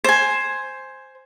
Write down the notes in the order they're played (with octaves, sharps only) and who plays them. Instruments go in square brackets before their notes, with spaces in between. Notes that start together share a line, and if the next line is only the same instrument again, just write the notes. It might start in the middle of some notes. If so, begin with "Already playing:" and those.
[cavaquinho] C5 G#5